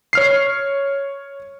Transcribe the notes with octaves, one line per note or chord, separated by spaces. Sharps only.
C#5 F6 C7